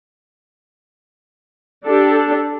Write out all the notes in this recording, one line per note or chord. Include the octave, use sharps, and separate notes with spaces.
D4 G4 A4